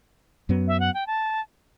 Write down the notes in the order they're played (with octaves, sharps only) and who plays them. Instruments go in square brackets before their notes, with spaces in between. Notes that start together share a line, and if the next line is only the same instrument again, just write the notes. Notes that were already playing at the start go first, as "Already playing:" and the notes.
[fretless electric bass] F#2 F#3 B3
[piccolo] E5
F#5
G5
A5